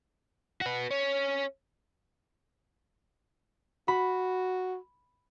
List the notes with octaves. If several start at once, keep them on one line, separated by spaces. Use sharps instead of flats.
F#4 B4
C#4
F#4 B5